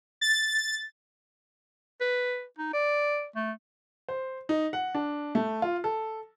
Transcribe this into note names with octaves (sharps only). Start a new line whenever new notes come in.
A6
B4
D#4
D5
A3
C5
D#4
F#5
D4
A3
F4
A4